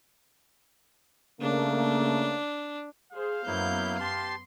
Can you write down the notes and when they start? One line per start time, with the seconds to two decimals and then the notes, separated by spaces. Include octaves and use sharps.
1.41 C#3 A3 A#3 D4
3.12 G#4 C5 F5
3.47 F#2 F#3 A#3 B3 E4 G6
4.00 G4 A5 C6